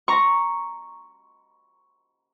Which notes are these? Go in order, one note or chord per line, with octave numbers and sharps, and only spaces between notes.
A#5 C#6